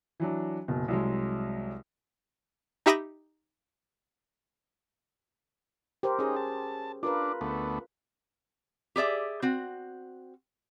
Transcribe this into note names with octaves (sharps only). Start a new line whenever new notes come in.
E3 F#3 D4
F#1 B2
C2 F#3 G#3
D#4 G4 E5 B5 D#6 A#6
G4 A#4 C5
C#4 D#4 G#4
A5
D4 F4 A#4 B4
D2 A3 B3
G4 G#4 D5 E5
C4 F#4